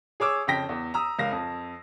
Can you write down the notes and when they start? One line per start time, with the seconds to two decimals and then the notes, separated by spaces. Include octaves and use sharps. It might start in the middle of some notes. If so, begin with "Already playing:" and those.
0.20 G#4 C#5 D6 E6
0.47 F2 C#3 G5 A#6 B6
0.69 E2
0.94 A#5 D#6 E6
1.19 C#2 A#4 F5 A#6
1.31 F2